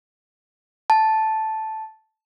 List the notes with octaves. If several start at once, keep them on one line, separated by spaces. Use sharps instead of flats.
A5